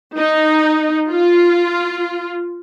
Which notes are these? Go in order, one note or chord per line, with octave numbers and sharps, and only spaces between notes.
D#4
F4